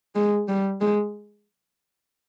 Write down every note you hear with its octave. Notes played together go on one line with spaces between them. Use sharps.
G#3
G3
G#3